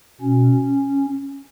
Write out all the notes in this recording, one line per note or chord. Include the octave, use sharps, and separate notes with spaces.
B2 C#4